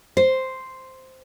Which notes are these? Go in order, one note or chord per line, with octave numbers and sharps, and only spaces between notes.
C5